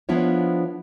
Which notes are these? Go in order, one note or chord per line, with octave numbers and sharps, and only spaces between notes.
F3 B3 D4 E4 F4 C#5